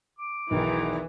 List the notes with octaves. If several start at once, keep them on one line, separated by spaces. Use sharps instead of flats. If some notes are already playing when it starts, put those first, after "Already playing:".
D6
B1 E2 D#3 E3